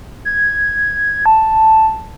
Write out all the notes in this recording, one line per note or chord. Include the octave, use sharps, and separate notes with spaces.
G#6
A5